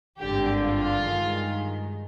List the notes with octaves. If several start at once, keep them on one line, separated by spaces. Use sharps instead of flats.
G#1 G2 D3 G4
F4
G2 D#3 G#3